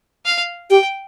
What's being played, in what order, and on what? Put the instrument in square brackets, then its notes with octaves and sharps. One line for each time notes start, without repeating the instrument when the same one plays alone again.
[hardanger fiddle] F5
[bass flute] G4 [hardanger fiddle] G5